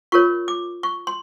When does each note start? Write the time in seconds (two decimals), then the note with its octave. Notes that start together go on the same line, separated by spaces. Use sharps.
0.12 F4 A#4 C#5 C#6
0.48 D6
0.83 C#6
1.07 C6